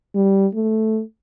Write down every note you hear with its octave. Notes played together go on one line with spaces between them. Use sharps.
G3
A3